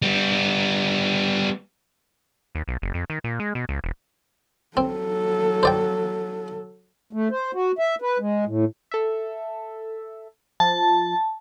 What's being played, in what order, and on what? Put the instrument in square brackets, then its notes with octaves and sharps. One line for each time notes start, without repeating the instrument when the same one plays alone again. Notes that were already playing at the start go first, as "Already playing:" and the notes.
[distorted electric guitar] G3 B3
[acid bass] D#2
B1
F#1
F2
D#3
A#2
G#3
B2
C#2
E1
[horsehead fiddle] F#3 A4 [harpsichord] C4
[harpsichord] C5 D5 G5
[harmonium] A3
C5
F#4
E5
B4
G#3
A2
[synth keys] A4 E5
[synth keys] F3 [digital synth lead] A5